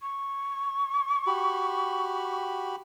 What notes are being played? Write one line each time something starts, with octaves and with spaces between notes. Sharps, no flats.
C#6
F#4 G4 B5